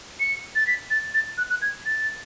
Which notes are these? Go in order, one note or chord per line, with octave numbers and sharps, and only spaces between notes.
C#7
A6
B6
A6
A6
F#6
F#6
G#6
A6